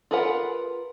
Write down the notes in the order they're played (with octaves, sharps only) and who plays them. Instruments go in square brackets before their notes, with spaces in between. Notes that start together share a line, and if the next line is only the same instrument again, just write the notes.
[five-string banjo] F4 G#4 A#4 B4 F#5